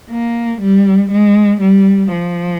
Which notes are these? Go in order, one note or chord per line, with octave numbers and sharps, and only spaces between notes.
A#3
G3
G#3
G3
F3